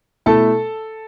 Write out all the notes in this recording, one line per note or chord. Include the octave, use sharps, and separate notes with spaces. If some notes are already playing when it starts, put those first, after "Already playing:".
B2 A3 E4 A4 A5